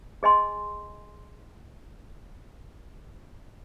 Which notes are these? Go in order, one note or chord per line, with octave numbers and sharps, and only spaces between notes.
G#4 D#5 G#5 C6